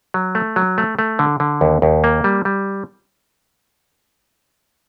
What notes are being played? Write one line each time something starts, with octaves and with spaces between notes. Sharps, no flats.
F#3
A3
F#3
A3
A3
D3
D3
D#2
D#2
A#3
G3
G3